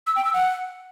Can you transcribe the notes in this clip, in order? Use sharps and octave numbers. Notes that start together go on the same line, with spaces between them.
E6
G5
E6
F#5